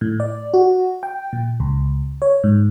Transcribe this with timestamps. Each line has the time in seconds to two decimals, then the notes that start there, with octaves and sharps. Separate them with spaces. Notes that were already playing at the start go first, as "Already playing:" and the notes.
0.01 A2
0.20 D5
0.54 F#4
1.03 G5
1.33 A#2
1.60 C#2
2.22 C#5
2.44 G#2